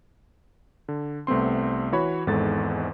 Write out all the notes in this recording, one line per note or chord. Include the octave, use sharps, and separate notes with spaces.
D3
C2 A3 B3 C4 C6
E3 F#4 C#5 B5
G#1 E2 G#2 G#3 A4 A6